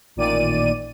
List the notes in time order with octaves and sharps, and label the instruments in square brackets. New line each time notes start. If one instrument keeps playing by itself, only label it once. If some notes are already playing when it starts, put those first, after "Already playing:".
[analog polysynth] A1 A#2 D#3 D5 D#7